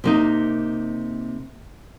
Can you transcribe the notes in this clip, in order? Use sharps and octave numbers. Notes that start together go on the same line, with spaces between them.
C3 A#3 D#4